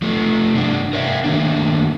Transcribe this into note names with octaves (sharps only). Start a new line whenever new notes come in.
F3 A3
G2 C3 D4
A#4 C#5 E5 F5
D#3 A3 A#3 D4